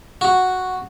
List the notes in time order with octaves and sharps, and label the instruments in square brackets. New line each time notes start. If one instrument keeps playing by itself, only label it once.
[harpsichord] F#4